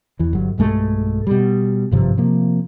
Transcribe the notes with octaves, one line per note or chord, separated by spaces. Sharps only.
E2 E3
G1 F#3
B1 G2 G#3 A3
B2 G3
G#1 G2 C3 F3
C3 F3 A#3